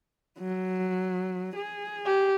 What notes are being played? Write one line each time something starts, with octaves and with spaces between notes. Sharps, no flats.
F#3
G#4
G4